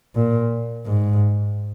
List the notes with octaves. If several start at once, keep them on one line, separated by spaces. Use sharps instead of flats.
A#2
G#2